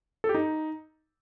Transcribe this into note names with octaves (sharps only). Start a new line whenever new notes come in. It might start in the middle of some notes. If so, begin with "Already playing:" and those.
A4
G4
D#4